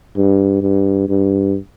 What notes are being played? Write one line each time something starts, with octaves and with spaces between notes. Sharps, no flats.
G2
G2
G2